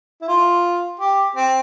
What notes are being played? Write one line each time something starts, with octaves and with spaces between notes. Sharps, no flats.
E4
F4
G4
C4